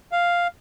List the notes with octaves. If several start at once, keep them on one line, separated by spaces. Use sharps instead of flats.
F5